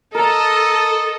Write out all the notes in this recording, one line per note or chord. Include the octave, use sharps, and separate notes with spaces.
A4 A#4 D#5 A#5